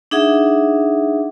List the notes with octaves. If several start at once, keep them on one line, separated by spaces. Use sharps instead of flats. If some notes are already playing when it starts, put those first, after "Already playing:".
D4 D#4 G#4 E5 F#5